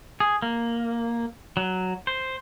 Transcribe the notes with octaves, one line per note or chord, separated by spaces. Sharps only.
G#4
A#3
F#3
C5